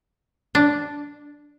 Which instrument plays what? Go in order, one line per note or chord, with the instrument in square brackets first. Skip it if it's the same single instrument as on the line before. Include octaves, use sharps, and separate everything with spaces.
[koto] D4